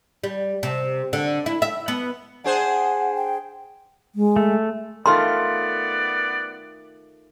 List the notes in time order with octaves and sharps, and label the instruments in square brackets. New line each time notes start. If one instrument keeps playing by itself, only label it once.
[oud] G3
C3
D3
E4
E5
B3
[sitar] D4 G#4 C5 [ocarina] F#5
[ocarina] G5
[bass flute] G#3
[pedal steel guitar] A3
[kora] D#3 A3 F4 [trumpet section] B3 D5 [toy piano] C6